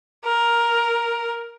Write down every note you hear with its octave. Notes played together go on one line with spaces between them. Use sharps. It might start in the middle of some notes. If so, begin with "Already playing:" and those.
A#4